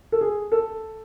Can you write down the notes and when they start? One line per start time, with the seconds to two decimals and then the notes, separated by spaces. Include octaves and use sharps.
0.12 A4
0.21 G#4
0.52 A4